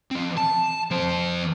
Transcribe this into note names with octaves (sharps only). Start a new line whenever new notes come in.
F3 C4
A5
F2 C5